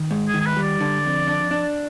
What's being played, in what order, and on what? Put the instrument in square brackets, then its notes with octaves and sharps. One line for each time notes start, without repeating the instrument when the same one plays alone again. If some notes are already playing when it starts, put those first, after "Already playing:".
Already playing: [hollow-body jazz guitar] D#3
G#2
[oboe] G#4
[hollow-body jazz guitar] D#3
[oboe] G#4
B4
[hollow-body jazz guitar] G3
[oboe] D5
[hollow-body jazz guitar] D3
F2
D4
D4